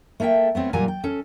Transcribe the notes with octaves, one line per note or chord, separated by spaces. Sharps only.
A3 A#3 A4 E5 G5
A3 B3 C4 C#5
A#2 F#3 G3 A#3 G#5 A#5
G5
C#4 A4